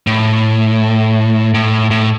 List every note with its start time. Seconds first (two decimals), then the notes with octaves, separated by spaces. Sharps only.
0.07 A2
1.54 A2
1.91 A2